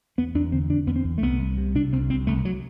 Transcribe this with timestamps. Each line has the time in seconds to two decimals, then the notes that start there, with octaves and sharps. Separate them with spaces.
0.18 E2 B3
0.34 E2 D4
0.52 D3 C4
0.70 D3 D4
0.87 E2 B3
0.96 C4
1.04 E2
1.18 A3
1.22 C2 B3
1.39 C2
1.57 C3
1.75 C3 D4
1.93 C2 C4
2.10 C2 C4
2.27 C2 A3
2.45 F#3